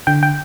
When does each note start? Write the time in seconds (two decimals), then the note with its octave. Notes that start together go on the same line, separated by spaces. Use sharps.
0.07 D3 G5
0.23 G5